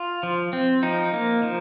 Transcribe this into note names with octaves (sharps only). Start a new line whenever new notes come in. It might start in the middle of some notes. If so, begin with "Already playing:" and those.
Already playing: F4
F3
C4
F3 D#4
A#3
F3